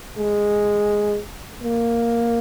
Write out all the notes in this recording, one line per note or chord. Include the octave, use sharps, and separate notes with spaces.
G#3
A#3